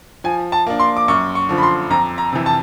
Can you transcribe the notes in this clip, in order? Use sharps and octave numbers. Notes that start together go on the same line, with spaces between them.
F3 G#5
A5
A#3 D4
C6
D6
F#2 C#6
C#6
D3 F3
B5
C6
F2 A#5
A#5
C3 E3
A5